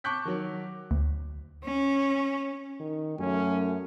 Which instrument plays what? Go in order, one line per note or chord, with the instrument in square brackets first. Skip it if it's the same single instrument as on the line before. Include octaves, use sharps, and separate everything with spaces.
[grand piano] A5 C#6 D6 F#6 G6 B6
D#3 F#3
[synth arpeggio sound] D2
[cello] C#4
[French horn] D#3
[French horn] F#2 [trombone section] F#3 A3 [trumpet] C#4